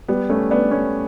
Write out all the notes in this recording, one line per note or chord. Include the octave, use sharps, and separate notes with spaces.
G3 B3
A3 C#4
B3 D4
A3 C#4